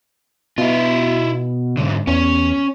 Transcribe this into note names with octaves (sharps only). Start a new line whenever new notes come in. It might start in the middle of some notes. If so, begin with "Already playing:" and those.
B2 E4 F4
G#2 D3
E2 C#4